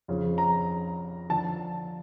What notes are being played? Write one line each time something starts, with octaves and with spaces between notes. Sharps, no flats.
F2 C#3 F3
A#5
D3 F3 A5